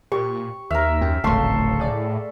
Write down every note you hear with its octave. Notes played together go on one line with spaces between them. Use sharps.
A#2 G4 C#6
D#2 A#4 E5 F6
F#2 G5
D1 G#1 C#3 A3 A4 F5 C6 C#6
A2 G#4 D5